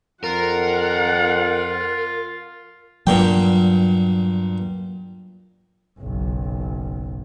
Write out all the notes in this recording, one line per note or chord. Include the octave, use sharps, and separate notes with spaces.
F2 F4 A#4 F#5
G2 A#2 F#3 G5
F#1 B1